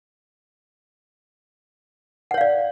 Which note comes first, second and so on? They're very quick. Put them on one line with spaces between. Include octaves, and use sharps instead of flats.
F#5 C#5 F5 D5